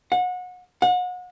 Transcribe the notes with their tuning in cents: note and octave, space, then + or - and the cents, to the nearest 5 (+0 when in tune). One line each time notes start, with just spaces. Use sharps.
F#5 -30
F#5 -35